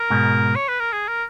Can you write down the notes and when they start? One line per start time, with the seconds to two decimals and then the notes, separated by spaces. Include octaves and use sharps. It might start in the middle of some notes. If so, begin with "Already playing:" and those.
Already playing: A#4
0.10 G#2 B2
0.55 C#5
0.68 B4
0.80 A#4
0.92 G#4
1.08 A#4